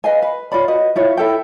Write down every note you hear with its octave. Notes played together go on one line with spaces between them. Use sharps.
B4 D#5 F5 G#5
B4
F4 C#5 D5 B5
F#4 B4 D#5
E4 F4 C#5
E4 A4 G5